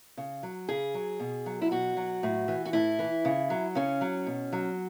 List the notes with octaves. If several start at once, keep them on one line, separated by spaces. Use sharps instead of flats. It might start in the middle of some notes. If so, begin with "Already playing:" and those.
C#3
F#3
C#3 G#4
F#3
B2
F#3
E4
B2 F#4
F#3
A2
E3
F#4
A2 E4
E3
C#3
F#3
C#3 C#4
F#3
B2
F#3